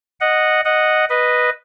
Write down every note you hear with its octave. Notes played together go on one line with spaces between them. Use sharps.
D#5 F#5
D#5 F#5
B4 D#5